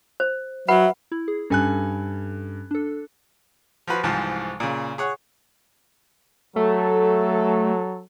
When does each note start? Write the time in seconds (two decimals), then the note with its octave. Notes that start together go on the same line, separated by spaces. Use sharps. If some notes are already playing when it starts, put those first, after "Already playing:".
0.20 C5
0.68 F#3 B4 E5 F#5 B5
1.12 E4
1.28 G#4
1.50 G2 C#4 A4 G#5 F#6
2.71 D4 A4
3.87 F3 F4 F#4 B4
4.03 C2 G#2 E3 F3 A5
4.60 A#2 C#3
4.98 G#4 C#5 F#5
6.56 F#3 A3 A4